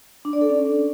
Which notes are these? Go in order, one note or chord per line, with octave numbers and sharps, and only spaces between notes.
D4
D5
A4
C#4